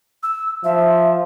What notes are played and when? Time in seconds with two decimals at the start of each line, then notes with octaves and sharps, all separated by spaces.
0.23 E6
0.64 F3 E5